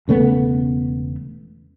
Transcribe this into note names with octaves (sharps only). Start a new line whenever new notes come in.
E1 C#3 A3 B3